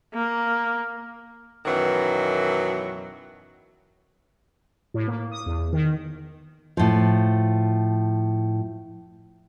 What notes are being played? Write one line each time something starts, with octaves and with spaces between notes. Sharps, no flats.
A#3
F#2 B2 D#3 E3 F#3
A2
A#3
D#6
E2
D#3
A2 F3